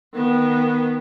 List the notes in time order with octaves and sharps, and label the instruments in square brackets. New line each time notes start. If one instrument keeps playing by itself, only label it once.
[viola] D#3 B3